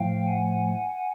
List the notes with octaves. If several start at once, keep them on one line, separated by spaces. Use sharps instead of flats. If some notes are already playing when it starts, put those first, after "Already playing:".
Already playing: A2 F3 A3 F5 G5
F#5 G#5